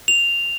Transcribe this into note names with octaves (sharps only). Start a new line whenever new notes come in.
F7